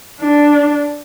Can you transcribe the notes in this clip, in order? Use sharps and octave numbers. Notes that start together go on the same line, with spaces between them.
D4